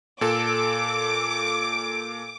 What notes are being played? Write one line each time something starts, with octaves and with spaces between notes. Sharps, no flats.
A#2 A4 D6